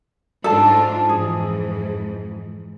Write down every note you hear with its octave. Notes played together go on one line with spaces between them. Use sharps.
G#2 D4 F4 A4 A5
F2 G#2 E3 G#4